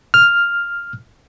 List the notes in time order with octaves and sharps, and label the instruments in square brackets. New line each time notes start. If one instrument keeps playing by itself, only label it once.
[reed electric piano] F6